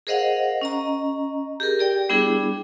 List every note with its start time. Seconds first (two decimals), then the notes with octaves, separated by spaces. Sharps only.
0.07 G#4 A#4 C5 D#5 F5 F#5
0.61 C#4 D#5 A#5
1.60 G4 G#4 A#4
1.79 G4 D5 G5
2.09 G3 B3 D4 E4 G#4